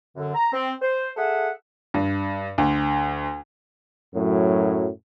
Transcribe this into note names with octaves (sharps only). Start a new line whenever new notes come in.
F#2 D3
A#5
C4
C5
G#4 A4 E5 F#5
G2
D2
F#2 A2 F#3